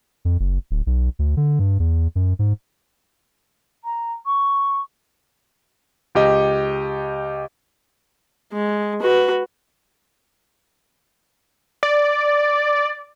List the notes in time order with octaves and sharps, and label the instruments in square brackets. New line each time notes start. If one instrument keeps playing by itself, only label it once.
[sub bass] F2
F#1
D1
B1
D2
D3
G2
E2
F#2
G#2
[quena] A#5
C#6
[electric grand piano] C#2 G4 D#5
[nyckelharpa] G#3
F#4 B4
[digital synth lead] D5